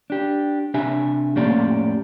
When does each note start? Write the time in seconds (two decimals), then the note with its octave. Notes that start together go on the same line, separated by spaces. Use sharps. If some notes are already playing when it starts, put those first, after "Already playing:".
0.10 D4 G4
0.74 C3 D4 G4 E5 G#5
1.35 F2 A2 A#3 C#4 G4 D5